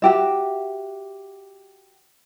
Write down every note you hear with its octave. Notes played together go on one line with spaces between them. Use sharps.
F#4 G4 E5